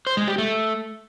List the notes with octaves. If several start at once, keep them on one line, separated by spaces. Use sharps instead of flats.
C5
G#3
G4
A3